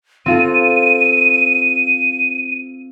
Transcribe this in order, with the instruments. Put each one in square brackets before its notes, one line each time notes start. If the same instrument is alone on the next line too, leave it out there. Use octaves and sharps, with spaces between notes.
[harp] C4 F4 A4 [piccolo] D#7